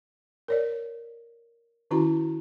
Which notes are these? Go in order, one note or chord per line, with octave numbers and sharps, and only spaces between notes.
A#4 C#5 D5
D#3 C#4 E4 F#4 A#5